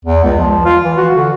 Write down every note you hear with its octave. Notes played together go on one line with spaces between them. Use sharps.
E2
C#2
F3
F3
F4
E3
F#4
D3